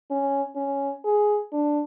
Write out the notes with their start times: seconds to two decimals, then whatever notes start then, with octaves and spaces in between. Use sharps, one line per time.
0.11 C#4
0.56 C#4
1.05 G#4
1.53 D4